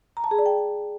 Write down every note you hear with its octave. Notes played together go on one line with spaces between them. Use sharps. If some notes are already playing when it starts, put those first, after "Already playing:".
A#5
A5
G#4
D5
G5